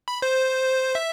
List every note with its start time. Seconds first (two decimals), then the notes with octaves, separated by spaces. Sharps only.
0.08 B5
0.22 C5
0.95 E5